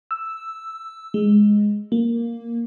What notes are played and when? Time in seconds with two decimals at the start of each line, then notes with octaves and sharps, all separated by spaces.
0.11 E6
1.14 G#3
1.92 A#3